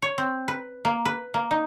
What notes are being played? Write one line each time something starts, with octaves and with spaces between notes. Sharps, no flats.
C#5
C4
B4
A#3
B4
A#3
D#4